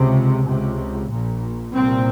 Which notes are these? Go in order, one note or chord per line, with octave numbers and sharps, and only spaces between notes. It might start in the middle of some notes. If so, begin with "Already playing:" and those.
Already playing: C#2 C3
C#2 C3
A#1 A#2
C2 A#2 C4